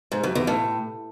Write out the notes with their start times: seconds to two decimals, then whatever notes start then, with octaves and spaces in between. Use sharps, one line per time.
0.12 G#2
0.23 F#2
0.35 E2
0.47 A2